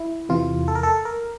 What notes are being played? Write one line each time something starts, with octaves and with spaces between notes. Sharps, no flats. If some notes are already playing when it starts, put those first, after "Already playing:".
Already playing: E4
E2 C3 E3 F4
A4
A#4
A4
A#4